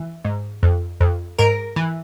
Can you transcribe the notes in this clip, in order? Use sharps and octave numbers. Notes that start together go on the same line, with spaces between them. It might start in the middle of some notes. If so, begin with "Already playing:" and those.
Already playing: E3
G#2
F2
F2
G#2 A#4
E3